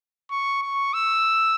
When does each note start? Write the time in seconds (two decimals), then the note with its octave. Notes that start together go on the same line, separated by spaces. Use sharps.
0.31 C#6
0.62 C#6
0.94 E6